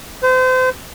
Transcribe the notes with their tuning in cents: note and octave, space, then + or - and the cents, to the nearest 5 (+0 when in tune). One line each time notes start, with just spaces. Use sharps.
C5 -35